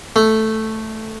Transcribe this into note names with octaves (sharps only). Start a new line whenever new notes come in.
A3